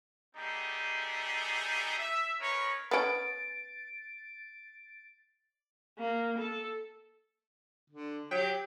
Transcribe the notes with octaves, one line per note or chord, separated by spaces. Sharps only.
G3 A3 B3 D#4 G4 G#4
E5
C#4 D#4 A#4 B4 C#5
B3 C#4 A6 D7
A#3
A4
D3
F#3 G4 G5